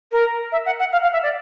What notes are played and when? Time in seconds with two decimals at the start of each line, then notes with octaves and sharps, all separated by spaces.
0.12 A#4
0.52 E5
0.66 F#5
0.79 F#5
0.92 F5
1.02 F5
1.13 E5
1.23 D5